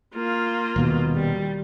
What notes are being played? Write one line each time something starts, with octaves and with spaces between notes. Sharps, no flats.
A#3 F4
D#1 D#2 B2
G3